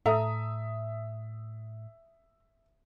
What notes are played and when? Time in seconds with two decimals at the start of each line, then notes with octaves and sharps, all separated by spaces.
0.06 A2 A4 E5 A#5 D#6